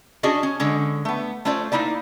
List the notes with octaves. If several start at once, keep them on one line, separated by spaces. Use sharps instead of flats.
C#4 D4 F#4 G#4 D5 D#5
C#4
D3 G#3 C#4
A3 B3
A3 C#4 F4 C5 D5
A#3 C4 D#4 E4 D5